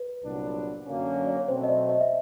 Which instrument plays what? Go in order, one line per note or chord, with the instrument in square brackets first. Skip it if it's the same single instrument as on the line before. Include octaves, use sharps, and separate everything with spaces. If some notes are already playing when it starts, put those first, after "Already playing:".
Already playing: [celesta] B4
[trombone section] C2 A#2 F#3 B3 D4
F#2 D3 F#3 A#3 C#4
[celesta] D5
C#5
[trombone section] B2 F#3 A3 C4 [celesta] C5
[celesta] D#5
D5
D#5
E5